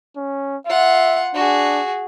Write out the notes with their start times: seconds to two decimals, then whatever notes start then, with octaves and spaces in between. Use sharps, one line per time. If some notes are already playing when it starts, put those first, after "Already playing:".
0.16 C#4
0.67 F4 E5 F#5
1.34 D4 F#4 G#4